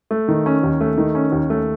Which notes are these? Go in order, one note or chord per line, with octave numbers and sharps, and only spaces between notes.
A3
D#3
C#4
D#2
A3
D#3
C#4
D#2
A3